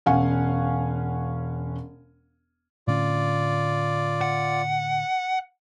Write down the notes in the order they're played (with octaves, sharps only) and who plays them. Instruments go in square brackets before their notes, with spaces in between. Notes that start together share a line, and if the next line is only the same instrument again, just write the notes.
[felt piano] E1 C#4 F5 F#5 G#5
[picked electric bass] A2 D3 C#4 [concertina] F4 D5
[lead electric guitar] F#5